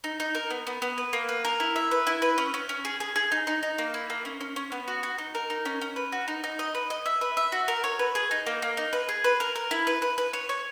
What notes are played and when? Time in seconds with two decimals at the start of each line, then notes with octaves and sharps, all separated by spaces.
0.04 D#4
0.20 D#4
0.35 A#4
0.50 B3
0.67 B3
0.82 B3
0.98 B4
1.13 A#3
1.29 B4
1.45 A#4
1.60 E4
1.76 E5
1.91 B4
2.07 E4
2.22 B4
2.38 C#4
2.54 C#4
2.69 C#4
2.85 G#4
3.00 G#4
3.16 G#4
3.32 D#4
3.47 D#4
3.63 D#4
3.78 A#3
3.94 E4
4.10 A#3
4.25 C#4
4.41 C#4
4.56 C#4
4.72 B3
4.88 F#4
5.03 F#4
5.18 D#4
5.35 A#4
5.50 D#4
5.65 C#4
5.81 C#4
5.96 B4
6.12 F#4
6.28 D#4
6.44 D#4
6.59 D#5
6.75 B4
6.90 D#5
7.06 E5
7.21 B4
7.37 E5
7.52 F#4
7.68 A#4
7.84 C#5
7.99 B4
8.15 G#4
8.31 D#4
8.46 A#3
8.62 A#3
8.77 D#4
8.93 B4
9.09 G#4
9.24 B4
9.40 A#4
9.55 A#4
9.71 E4
9.87 B4
10.02 B4
10.18 B4
10.33 C#5
10.49 C#5